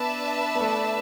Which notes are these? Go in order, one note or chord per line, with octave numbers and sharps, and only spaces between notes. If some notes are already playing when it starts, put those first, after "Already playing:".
Already playing: B3 D4 B4 E5 A5
B3
A3